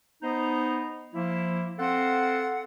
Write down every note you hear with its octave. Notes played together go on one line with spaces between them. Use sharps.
B3 D#4 C5 D#5 A#5
F3 A#3 E4
C4 A4 F5 F#5